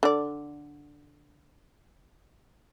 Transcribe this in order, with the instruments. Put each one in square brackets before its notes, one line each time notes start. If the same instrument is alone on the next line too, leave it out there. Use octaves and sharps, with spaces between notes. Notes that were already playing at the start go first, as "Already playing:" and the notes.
[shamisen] D3 D5